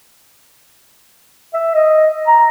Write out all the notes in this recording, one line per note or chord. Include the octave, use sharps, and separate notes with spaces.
E5
D#5
A#5